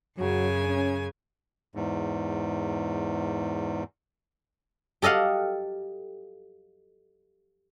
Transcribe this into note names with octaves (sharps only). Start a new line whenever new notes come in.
F#2 C#3 F#3 G#5
C#4
E2 G#2
G4 A4 D#5 F5 F#5